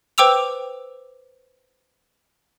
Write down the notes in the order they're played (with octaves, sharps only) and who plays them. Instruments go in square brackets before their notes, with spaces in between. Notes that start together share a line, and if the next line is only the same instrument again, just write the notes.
[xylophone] B4 C5 G5 D6 E6 F7